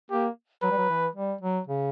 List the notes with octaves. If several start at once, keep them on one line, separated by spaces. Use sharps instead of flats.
A#3 G4
F#3 B4
G3
F#3
E3
G3
F#3
C#3